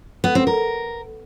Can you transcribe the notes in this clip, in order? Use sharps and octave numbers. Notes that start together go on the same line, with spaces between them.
B3
C4
A#4